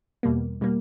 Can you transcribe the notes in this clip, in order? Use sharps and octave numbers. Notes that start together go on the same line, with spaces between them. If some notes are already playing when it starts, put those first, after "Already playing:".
E2 B2 G3 A#3
B2 G3 A#3